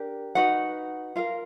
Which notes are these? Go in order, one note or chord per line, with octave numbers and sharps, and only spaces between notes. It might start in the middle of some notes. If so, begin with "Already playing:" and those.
Already playing: D4 G4 A#4
D#4 F#4 B4 F#5
F4 A#4 F5